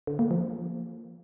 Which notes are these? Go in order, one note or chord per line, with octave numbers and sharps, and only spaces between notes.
D3
A#3
F3